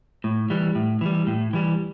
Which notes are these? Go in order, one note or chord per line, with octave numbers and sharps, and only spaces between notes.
A2
E3 G3
A2
E3 G3
A2
E3 G3